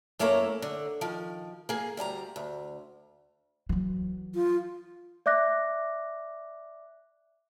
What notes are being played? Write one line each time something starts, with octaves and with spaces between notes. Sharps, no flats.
F#2 A3 A#3 E4 C#5 A#5
D3
D#3 F3
A#3 G#4
D2 G3 A5 A#5
D2
E3 F#3
F4
D5 E5 D6 F#6 A#6